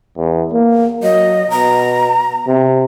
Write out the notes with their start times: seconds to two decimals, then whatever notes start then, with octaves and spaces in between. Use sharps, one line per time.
0.17 E2
0.53 A#3
1.03 F#3 D#5
1.50 B2 A#5
2.47 C3